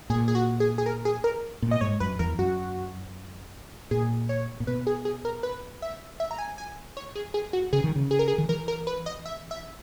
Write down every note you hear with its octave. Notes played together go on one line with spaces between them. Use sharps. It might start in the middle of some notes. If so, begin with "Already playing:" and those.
A#2 G#4
G#4
F#4
G#4
G#4
A#4
G#4
A#4
A#2
D#5
G#2 C#5
F#2 B4
E2 A#4
F#2 F#4
A#2 G#4
C#5
A#2
B2 B4
G#4
G#4
A#4
B4
E5
E5
A#5
G#5
G#5
C#5
G#4
G#4
F#4
C#3 G#4
D#3
C#3
G#4
A#4
G#4
D#3
E3 A#4
A#4
B4
D#5
E5
E5